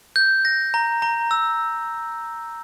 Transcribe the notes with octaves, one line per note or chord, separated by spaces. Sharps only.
G6
A#6
A#5
A#5
E6